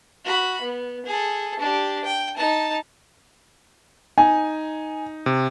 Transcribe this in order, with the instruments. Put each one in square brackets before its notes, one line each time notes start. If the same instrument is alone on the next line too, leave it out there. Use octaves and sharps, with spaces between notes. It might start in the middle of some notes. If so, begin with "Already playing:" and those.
[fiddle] F#4 B5
B3
G#4 A4
D4 G4
G5
D#4 A5
[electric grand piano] D#4 [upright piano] G#5
[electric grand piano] C3